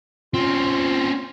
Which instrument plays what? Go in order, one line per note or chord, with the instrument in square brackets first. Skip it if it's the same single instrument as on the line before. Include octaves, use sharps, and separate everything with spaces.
[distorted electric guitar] C4 C#4 [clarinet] F4